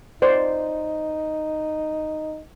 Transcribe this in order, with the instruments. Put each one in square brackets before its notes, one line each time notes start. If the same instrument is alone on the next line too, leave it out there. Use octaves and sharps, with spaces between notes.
[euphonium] D#4 [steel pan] C5 D5